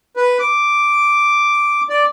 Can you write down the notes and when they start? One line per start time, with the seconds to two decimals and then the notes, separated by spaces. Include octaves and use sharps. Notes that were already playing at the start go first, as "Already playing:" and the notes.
0.16 B4
0.39 D6
1.90 D5